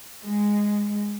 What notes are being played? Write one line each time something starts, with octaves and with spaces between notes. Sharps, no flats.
G#3